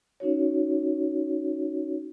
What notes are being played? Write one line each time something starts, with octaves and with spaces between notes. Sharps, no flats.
C#4 D#4 F#4 C#5